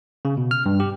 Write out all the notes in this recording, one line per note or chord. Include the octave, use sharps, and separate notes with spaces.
C#3
B2
F6
G2
G4